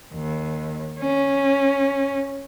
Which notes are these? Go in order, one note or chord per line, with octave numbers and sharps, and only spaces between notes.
D#2
C#4